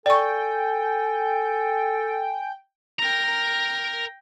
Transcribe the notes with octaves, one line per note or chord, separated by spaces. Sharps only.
A4 D5 G5 G#5 C#6
A#4 G5 A#5 A#6